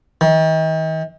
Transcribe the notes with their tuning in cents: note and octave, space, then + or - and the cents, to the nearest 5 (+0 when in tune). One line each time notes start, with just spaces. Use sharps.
D#3 +40